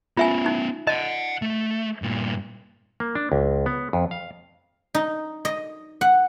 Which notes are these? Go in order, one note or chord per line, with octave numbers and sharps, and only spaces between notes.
B3 C#4 F4 E5 G#5
D#4
D#5 F#5 A5
A3
G2 A#2
A#3
D4
C#2
B3
F2
F5
D#4
D#5
F#5